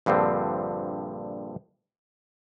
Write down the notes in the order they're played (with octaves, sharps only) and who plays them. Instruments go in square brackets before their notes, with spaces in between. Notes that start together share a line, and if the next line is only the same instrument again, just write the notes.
[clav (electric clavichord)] A#1 G2 D3 F3 C4